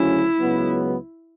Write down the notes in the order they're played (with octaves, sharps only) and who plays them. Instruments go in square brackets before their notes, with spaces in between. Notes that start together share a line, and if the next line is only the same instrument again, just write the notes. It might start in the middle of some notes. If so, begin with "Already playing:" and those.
Already playing: [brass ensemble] D2 C#3 F#3 C#4 [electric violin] E4
[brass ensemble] C#2 C#3 F#3 B3